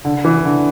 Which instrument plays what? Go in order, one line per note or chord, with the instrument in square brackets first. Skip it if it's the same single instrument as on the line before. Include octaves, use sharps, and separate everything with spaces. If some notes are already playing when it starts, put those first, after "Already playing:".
[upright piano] D3
E3
D3